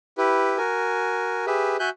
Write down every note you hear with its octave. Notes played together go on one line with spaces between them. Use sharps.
E4 G4 B4
F#4 A#4 G#5
G4 G#4 B4 E5
F#4 E5 G#5 F#6 G6